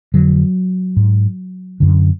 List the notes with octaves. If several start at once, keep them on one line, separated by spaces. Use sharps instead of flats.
F2 D3 F#3
G#2
F#2 D3